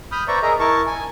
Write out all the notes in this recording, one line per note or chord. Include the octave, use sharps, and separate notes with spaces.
B5 D#6 F6 G6
B4 C5 D5 E5 A#5 C#6
G#4 A#4 D#5 E5 A#5
E4 A#4 A5 C#6
G#5